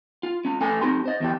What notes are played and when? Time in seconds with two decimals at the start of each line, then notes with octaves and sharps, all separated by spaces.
0.23 F4
0.45 C#4 F4
0.61 A3 C#4 A4 B4 G#5
0.81 C4 D#4 G4 C6
1.06 C5 D#5
1.20 E2 E3 G4